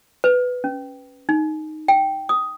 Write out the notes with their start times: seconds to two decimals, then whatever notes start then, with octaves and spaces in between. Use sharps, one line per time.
0.24 B4
0.64 C#4
1.29 D#4
1.88 G5
2.29 D#6